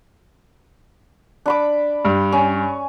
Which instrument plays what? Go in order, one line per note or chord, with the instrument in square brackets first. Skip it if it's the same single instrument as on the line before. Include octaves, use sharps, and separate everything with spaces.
[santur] D4 B5 D6
[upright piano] G2
[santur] C#4